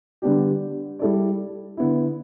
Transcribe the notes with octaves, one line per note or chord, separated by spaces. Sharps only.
D3 G3 B3 D4 G4
G3 E4 A4 D5
D3 B3 E4